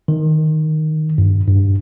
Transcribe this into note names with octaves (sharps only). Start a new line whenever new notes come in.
D#3
G2
G2